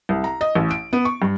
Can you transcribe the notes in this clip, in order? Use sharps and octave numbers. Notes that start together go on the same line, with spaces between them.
C2
A#5
D#5
A1
D7
B3
C#6
G2